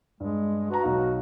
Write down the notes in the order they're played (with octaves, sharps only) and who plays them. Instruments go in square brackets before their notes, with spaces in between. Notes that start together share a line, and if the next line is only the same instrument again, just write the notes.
[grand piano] G2 [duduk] G#3
[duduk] F#4 [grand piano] B4 A5 A#5
[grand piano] B1 D#4 F5